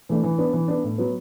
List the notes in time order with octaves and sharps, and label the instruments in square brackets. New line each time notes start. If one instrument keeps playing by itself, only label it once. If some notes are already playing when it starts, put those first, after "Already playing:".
[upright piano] E3 A3 D4
E3
B3 D4
E3
B3 D4
A2
F#3 B3